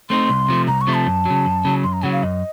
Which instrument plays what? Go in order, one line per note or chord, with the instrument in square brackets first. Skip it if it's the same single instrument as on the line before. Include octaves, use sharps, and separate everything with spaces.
[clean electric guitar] A3 C4 D#4 [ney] C6
[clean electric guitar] C2
C3 F3 A3
[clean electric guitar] C2 [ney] A#5
[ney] C#6
[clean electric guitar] C3 F3 A3
[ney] A5
[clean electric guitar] F#2
C#3 F#3
F#2
C#3 F#3
[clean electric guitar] F#2 [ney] C6
[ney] A#5
[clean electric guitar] C#3 F#3 [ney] F#5
[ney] F5
[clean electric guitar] F#2 [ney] D#5